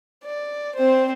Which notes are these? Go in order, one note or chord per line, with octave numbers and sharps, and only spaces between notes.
D5
C4 C5